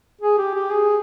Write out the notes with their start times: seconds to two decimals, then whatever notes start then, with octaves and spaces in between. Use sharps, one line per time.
0.21 G#4
0.38 G4
0.55 G4
0.71 G#4